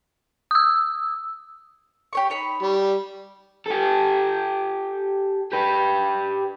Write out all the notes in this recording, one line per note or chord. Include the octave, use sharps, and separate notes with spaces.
D#6 E6
G4 C#5 C#6
D#4 C#5 B5
G3
G4 A4
G4 B4